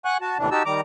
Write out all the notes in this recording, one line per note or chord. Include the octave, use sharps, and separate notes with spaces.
F#5 G#5 C#6 F#6
F#4 A5
D#2 A2 C3 E3 D4
D#4 F#4 G4 A5 E6
D#3 G3 A#5 D6